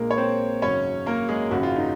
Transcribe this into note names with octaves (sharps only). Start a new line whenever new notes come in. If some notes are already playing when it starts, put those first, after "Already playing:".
Already playing: A#1 A#2 G#3 A#3 A#4
C#5
C4 C5
G#1 F#2 C#3 F#3 C#4 C#5
A#3 A#4
G#3 G#4
G#1 F#2 C#3 F#3 F#4
F4
D#4